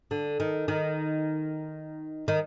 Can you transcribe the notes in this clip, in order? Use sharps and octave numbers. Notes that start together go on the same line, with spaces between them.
D3
D#3
D#3
D#3